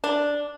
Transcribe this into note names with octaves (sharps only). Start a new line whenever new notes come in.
D4